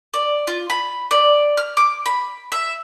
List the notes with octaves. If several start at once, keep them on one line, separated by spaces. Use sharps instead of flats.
D5
F4
B5
D5
F6
D6
B5
E5